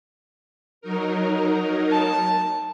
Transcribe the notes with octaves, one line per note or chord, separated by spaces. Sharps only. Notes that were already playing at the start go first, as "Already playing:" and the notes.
F#3 D#4 A#4
A5